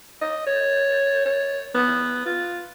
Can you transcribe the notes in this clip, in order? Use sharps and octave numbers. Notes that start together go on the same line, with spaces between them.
D#5
C#5
C#5
B3
F4